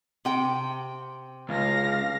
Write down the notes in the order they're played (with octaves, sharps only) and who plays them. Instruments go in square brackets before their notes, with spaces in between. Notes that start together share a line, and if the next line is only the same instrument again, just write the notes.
[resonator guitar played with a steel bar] C3 G5
[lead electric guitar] C#2 [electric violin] F5 A#6